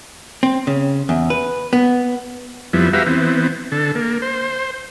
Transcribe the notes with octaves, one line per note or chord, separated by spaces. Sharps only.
C4
C#3
E2
B4
B3
F2 F3 G3 B3 E4
F#4 G4 B4 E5 F5 A#5
E3 B3 C4
D3 A4
A#3
C5